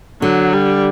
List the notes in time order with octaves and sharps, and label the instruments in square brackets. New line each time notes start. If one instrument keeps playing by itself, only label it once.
[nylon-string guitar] D3 [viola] F#3
[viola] G3